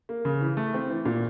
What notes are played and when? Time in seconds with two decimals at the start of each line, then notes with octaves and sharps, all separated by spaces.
0.09 A#3
0.25 C#3
0.41 E3
0.57 A3
0.74 C4
0.90 E3
1.05 A#2